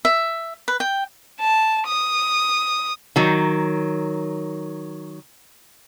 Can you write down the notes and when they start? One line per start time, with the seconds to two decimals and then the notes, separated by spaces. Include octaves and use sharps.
0.05 E5
0.68 B4
0.80 G5
1.41 A5
1.87 D#6
3.16 D#3 F#3